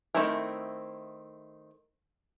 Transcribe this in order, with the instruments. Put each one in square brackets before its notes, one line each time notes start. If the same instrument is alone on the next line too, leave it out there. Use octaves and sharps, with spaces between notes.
[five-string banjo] D#3 A3 C4 E4 A#4